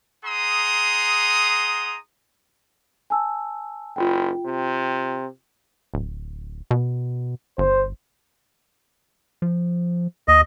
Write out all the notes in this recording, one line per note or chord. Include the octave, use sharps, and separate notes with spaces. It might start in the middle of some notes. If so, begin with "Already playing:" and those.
D#4 G#4 F#5 A#5 C6 D#6
G#5 A5 E6
F#1 F4 G5
C3
D1
B2
G1 C5
F3
D#2 D#5